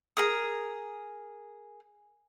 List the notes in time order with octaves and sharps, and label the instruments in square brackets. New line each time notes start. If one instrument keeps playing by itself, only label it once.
[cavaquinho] G#4 A#4 D#6